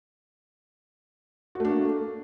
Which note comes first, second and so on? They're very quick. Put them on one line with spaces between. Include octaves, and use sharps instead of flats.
F#4 A3 D4 A#3